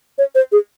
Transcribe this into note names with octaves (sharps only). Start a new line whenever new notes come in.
C#5
C5
G#4